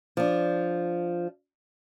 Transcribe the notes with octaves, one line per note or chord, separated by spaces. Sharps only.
F3 D4